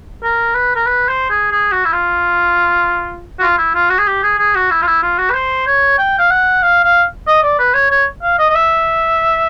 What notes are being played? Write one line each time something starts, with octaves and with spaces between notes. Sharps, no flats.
A#4
B4
A#4
B4
C5
G#4
G#4
F#4
E4
F4
F#4
F4
E4
F4
F#4
G#4
G4
G#4
G#4
F#4
E4
F4
E4
F4
F#4
B4
C5
C#5
G5
F5
F#5
F5
F5
D#5
D5
B4
C#5
C#5
F5
D#5
D#5
E5